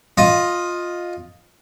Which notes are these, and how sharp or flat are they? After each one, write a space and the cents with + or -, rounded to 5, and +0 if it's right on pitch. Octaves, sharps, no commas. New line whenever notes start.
F4 +10 D#5 +0